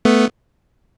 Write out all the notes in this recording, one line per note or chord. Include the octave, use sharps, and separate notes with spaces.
A3 B3